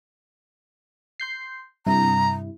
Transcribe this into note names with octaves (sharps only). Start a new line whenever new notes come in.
C6 G6 C7
G2 C3 E4 A#5